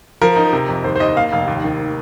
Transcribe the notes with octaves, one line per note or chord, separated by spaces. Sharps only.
F3 A#4
D#4
C3
F2
D#2 C5
C5
D#2 D#5
A#3 F5
F1 F5
D#2
D#3